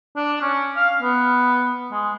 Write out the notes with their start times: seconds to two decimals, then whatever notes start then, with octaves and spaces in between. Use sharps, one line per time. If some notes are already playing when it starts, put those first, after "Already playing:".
0.16 D4
0.42 C#4
0.77 F5
1.02 B3
1.91 G#3